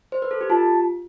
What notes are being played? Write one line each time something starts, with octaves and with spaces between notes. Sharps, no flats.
C5
B4
A4
G4
F4 A5